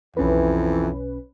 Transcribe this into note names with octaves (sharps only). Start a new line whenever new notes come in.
B1 F2 E3 C#4 B4